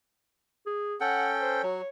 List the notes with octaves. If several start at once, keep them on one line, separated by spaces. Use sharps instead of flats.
G#4
C#4 A4 F#5 G5
C5
F#3 C#5